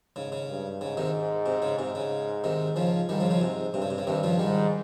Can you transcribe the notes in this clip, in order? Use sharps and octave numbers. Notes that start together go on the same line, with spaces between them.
G#2 C#3
C#3
G2
G#2 C#3
C3 D#3
C3
C#3
G#2 C3
C#3
C3 D#3
G#2 C#3 F3
G#2 D#3 G3
C#3 F3
C#3 F3
G#2 C3
G2 C3
C#3
C3
C#3
G2 C3 D#3
C#3 F3
G#2 D#3 G3